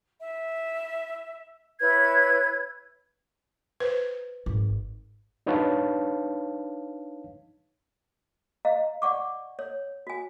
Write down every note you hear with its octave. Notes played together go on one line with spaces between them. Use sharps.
E5
E4 B4 C#5 G#6
B4 C5
G#1
D4 D#4 B4 C#5 F5 A5
D#5 F5 A#5
D5 F#5 C#6 D6
C#5
F#4 G#5